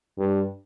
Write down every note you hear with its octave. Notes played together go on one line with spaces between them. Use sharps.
G2